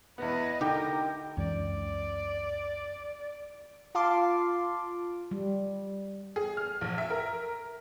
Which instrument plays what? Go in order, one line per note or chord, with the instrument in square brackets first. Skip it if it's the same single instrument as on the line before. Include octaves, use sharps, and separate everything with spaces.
[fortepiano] E2 B3 [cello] B4 D#5
[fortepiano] D3 [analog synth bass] D#4 [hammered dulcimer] G4 G5 [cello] A#4
[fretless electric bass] C#2 F#2 E3 [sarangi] D5
[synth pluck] F4 F5 A5 C6 D6
[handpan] G3
[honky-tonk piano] G#4
F6
A#1
E5
A#4